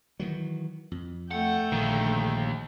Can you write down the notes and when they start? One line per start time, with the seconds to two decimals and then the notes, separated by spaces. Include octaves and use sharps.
0.20 D#3 E3 F#3
0.92 F2
1.31 A3 F#5 G5
1.72 A#1 D3 D#3 A#3